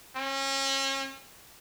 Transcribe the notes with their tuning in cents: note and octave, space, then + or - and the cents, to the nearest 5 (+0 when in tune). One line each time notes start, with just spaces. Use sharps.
C#4 -35